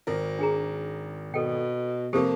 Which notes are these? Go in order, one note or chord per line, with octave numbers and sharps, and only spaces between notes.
G#1 A#4
D4 G#4 A#5
B2 A4 G5
F2 C3 A#3 G4 A4 C5